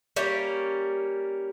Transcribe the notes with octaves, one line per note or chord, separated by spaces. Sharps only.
G3 A#3 C#4